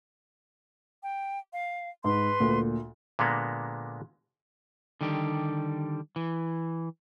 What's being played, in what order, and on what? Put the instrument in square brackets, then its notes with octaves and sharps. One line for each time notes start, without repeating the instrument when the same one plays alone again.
[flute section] G5
F5
[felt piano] G#2 [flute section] B4 C6
[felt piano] D2 A#2
[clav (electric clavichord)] A#2 D3 G#3 A#3 B3
[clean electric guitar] D3 D#3 G3 G4
E3